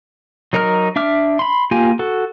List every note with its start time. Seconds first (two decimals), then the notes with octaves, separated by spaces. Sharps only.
0.53 F#3 D#4 A#4 A#5 F6
0.96 D4 E5 D6 F6
1.39 B5 C6
1.71 A#3 F4 G4 G#5
1.99 F#4 A4